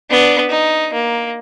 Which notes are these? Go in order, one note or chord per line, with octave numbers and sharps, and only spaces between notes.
B3 D4
D#4
A#3